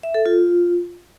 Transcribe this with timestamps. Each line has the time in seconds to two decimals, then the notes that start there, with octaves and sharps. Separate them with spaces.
0.03 E5
0.14 A4
0.26 F4